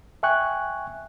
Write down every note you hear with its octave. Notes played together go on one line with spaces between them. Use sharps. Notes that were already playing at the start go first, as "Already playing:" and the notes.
E5 G5 G#5 C#6 F#6